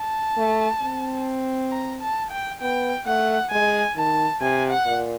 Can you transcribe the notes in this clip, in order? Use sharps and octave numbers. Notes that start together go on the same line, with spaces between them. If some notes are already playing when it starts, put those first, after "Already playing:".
Already playing: A5
A3
C4
A#5
A5
G5
B3 G5
A3 F#5
G#3 G#5
D#3 A5
C3 G#5
F#5
A#2